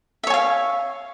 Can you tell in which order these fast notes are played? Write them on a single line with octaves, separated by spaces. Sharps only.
E5 C#5 G#5 F5